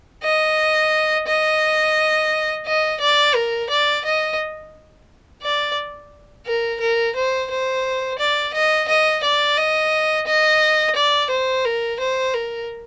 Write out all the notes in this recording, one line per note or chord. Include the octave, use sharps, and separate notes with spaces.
D#5
D#5
D#5
D5
A#4
D5
D#5
D5
A#4
A#4
C5
C5
D5
D#5
D#5
D5
D#5
D#5
D5
C5
A#4
C5
A#4